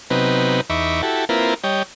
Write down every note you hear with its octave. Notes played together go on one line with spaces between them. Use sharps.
C3 F#3 B3 C4 D#4 B4
E2 D#4 E5 B5 C#6 D6
E4 F#4 G4 A4
A#3 C4 E4 F4 A#4 B4
G3 C#5 D#5 G5